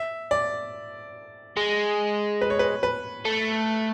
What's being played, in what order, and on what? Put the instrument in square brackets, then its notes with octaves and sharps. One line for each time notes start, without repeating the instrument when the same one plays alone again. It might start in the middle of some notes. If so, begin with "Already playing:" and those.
Already playing: [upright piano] E5
D5
[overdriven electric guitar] G#3
[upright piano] B4
C#5
B4
B4
[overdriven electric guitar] A3